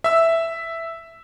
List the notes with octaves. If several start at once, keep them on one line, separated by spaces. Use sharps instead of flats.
E5 E6